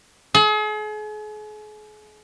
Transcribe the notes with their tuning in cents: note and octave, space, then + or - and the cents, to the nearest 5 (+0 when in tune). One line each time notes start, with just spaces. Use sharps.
G#4 +40